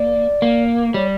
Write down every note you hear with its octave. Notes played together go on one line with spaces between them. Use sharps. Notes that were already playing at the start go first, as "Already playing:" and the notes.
Already playing: A#3 D5
A#3
G3 C#5